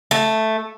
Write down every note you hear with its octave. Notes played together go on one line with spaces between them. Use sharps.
A3